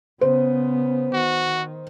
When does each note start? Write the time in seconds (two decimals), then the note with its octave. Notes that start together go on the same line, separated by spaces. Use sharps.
0.21 C#3 B3 C5
1.13 D#3 F#4